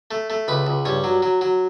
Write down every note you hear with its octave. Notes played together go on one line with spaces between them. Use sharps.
A3
A3
C#2 B4
C#2
G2 C#5
F#3
F#3
F#3